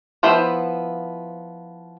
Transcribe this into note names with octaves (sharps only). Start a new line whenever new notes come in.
F3 B3 E4 C5 E5